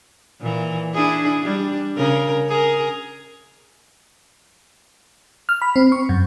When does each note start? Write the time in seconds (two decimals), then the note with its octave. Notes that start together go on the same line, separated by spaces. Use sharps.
0.40 A#2 E3
0.94 D4 E4 G#4
1.42 G3 D4
1.96 C#3 A#4
2.48 G#4 A#4
5.49 F6
5.62 B5
5.76 C4
5.92 C#6
6.09 F#2